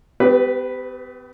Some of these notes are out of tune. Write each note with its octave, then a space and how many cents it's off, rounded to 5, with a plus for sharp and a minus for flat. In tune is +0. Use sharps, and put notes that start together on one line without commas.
B3 +45 G4 +0 B4 +0